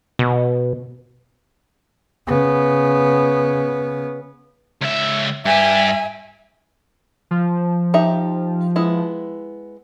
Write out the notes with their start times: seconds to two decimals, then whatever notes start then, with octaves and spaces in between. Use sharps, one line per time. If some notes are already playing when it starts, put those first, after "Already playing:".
0.19 B2
2.27 C#3 B3
4.82 C#2 E5
5.45 G2 G4 E5 G#5
7.31 F3
7.94 D#4 G4 E5
8.76 G#3 B3 E4